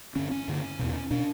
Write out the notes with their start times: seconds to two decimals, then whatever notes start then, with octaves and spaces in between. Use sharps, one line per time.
0.16 G2 D3 C#4
0.31 C#4
0.48 G2 D3
0.79 E2 B2
1.11 B2 D4